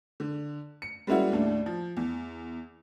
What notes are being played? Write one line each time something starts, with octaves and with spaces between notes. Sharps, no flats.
D3
C#7
G3 G#3 A#3 C#4 E4 F#4
D#2 A2 D4
F3
E2